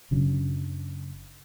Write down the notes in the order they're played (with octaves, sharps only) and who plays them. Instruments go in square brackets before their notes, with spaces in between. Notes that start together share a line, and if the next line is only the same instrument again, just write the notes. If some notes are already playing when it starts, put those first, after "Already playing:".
[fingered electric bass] F#1 C#3 F#3 D4